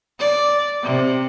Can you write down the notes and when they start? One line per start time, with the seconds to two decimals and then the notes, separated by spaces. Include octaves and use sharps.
0.19 D5
0.83 C3